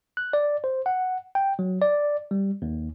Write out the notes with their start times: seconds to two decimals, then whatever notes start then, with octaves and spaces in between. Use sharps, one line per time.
0.17 F#6
0.33 D5
0.64 C5
0.86 F#5
1.35 G5
1.59 F#3
1.82 D5
2.31 G3
2.62 D#2